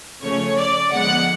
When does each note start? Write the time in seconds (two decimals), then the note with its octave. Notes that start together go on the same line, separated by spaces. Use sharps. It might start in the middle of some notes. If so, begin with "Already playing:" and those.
0.21 C#3 F3 A3 C#4 C#5
0.56 D5
0.91 D3 F3 G#3 B3 F#5